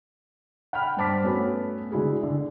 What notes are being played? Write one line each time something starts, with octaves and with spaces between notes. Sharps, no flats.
F#5 G5 B5 F6
G2 C5 A5 D6 B6
A3 B3 C#4 F#4 B4
D3 G#3 E4 F#4 G#4
D3